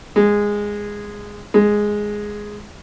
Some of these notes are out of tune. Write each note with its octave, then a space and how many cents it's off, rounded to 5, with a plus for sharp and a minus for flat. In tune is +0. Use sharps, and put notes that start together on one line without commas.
G#3 -10
G#3 +0